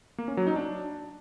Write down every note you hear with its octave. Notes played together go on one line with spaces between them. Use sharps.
A#3
C#4
F#3
D#4
D4